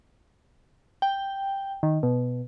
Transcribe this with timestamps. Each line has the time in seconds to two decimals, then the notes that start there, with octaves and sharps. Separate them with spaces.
1.02 G5
1.83 D#3
2.03 B2